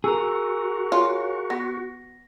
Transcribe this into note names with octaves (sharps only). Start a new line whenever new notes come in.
F#4 G#4 A#4 E6
F4 C#5 G#5
B3 A#6